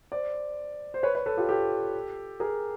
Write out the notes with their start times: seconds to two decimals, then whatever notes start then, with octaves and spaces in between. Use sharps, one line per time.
0.12 C5 D5
0.94 C5
1.03 B4 C#5
1.15 B4 C#5
1.26 A4 B4
1.37 F4 G4
1.49 G4 A4
2.40 G#4 A#4